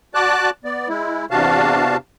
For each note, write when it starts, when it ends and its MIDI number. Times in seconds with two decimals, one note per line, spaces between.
0.14 0.50 66
0.14 0.50 74
0.14 0.50 81
0.14 0.50 86
0.14 0.50 90
0.65 0.88 59
0.65 0.88 74
0.89 1.26 56
0.89 1.26 64
1.31 1.97 40
1.31 1.97 48
1.31 1.97 62
1.31 1.97 66
1.31 1.97 77
1.31 1.97 81